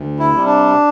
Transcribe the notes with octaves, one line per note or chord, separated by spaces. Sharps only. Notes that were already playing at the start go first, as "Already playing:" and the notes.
Already playing: D2
E4
C3 G3
D4